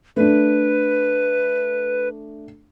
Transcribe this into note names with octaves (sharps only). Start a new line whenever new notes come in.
A3 D4 B4